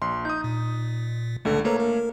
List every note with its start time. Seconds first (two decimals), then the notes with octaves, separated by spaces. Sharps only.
0.02 A#1 C6
0.25 D#4 D#6 G6
0.44 A#2
1.45 C#2 D3 A3 A4
1.64 A3 A#3 A4 B4 C#5 A#5
1.80 A#4